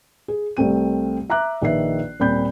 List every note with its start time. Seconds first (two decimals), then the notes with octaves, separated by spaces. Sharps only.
0.28 G#4
0.57 C2 A3 C4 D#7
1.30 E5 A#5 D6 F#6
1.62 A#1 D#3 B4 E5 C7
2.19 D#1 A#2 C4 B5 G6